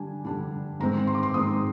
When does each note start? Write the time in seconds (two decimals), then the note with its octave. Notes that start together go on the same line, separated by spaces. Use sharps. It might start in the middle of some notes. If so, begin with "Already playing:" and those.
Already playing: D3 G3 D4 G#5
0.25 D3 G3 D4
0.80 G#2 D#3 G#3 C4 A#5
1.07 C6
1.15 D6
1.23 C6
1.34 G#2 D#3 G#3 C4 D#6